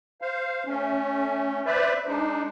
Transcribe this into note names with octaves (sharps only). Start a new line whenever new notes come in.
C5 F5
A3 C#4
B4 C5 D5 E5
G#3 D4 D#4